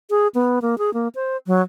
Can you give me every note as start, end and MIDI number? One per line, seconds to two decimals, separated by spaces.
0.10 0.28 68
0.35 0.59 59
0.62 0.78 58
0.78 0.93 68
0.94 1.08 58
1.15 1.37 72
1.47 1.62 54